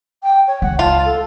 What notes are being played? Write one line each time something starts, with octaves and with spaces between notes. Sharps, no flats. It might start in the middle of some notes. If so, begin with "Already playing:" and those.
G5
C#5
C#2 F#5
F4 A5
A4